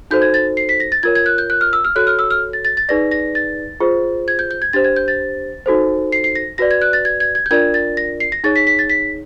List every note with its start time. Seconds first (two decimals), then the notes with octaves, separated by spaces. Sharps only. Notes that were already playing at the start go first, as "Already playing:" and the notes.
0.11 D#4 F#4 A4 C5 G6
0.22 G#6
0.34 A6
0.57 C7
0.69 B6
0.80 A#6
0.92 A6
1.03 F4 A#4 C#5 G#6
1.15 G#6
1.26 F#6
1.38 G6
1.50 F#6
1.61 F6
1.73 E6
1.85 F6
1.96 F#4 A4 C#5 F#6
2.07 F6
2.19 E6
2.31 F6
2.53 A6
2.65 A6
2.77 A6
2.89 D#4 G#4 B4 D5 A#6
3.11 A#6
3.35 A6
3.80 F4 G#4 C5
4.28 G#6
4.39 G6
4.51 G6
4.62 G#6
4.73 D4 G4 C5 A6
4.84 G#6
4.96 G6
5.08 A6
5.66 D#4 F#4 A4 C5
6.12 C7
6.24 C7
6.35 A#6
6.58 F#4 B4 D5 A#6
6.71 G#6
6.82 F#6
6.93 A6
7.05 G#6
7.20 G#6
7.35 G#6
7.46 G6
7.51 D4 F4 A#4 D5 G#6
7.74 A6
7.97 A#6
8.20 C7
8.32 A#6
8.44 D#4 G#4 C#5 A6
8.56 B6
8.67 B6
8.79 A6
8.90 B6